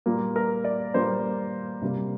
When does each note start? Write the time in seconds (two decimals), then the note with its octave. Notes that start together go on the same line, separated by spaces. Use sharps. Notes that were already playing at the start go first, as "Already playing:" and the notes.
0.06 A#2 G3 A#3
0.36 A#4
0.64 D5
0.94 A#2 G3 A#3 C5
1.82 C3 G3 A#3